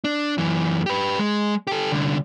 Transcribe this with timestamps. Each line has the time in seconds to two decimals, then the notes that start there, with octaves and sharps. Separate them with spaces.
0.04 D4
0.38 F#2 E3
0.86 G4 B4
1.19 G#3
1.67 G4 A4
1.92 C2 D3